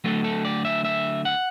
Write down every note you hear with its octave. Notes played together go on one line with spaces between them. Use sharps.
D3 F#3 A3 A4
A4
D5
E5
E5
F#5